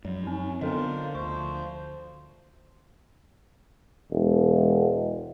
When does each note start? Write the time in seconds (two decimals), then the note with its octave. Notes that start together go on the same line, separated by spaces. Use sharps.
0.05 F#2 F3
0.23 C4 C#4 D#4
0.61 D3 B3 F4 A4 A#4 C5 D#5
1.15 D2 F3 C5 C#6
4.11 E1